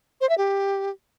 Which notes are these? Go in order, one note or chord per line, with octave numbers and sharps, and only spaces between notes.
C5
E5
G4